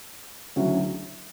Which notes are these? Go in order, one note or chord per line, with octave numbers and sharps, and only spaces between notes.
D2 C#3 F#3 C#4 E4